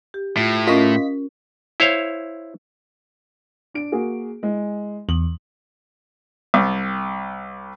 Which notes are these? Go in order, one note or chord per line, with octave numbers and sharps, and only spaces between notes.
G4
A2 F4
C#4 F4 A#4 D#5 B6
E4 C5 C#5 F5
D4 D7
A#3 F#4 G#4
G#3 E4
E2 F#7
C2